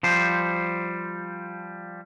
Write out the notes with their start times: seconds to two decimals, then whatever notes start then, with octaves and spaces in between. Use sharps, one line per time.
0.03 F3 G3 C5